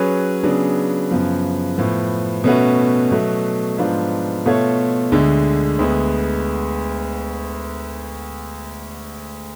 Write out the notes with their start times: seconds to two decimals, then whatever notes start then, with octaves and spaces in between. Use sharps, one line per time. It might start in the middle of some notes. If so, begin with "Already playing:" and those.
Already playing: F#3 C#4 G#4 B4
0.43 C#3 F#3 B3 D4 G#4
1.11 F#2 C#3 F3 B3
1.77 A2 F3 B3
2.44 B2 A3 C#4 F#4 B4
3.11 B2 F#3 A3
3.78 G#2 F3 B3 D4 F4
4.46 B2 A3 F4 A4 C#5
5.12 D2 D3 G#3
5.79 D2 D3 G#3 B3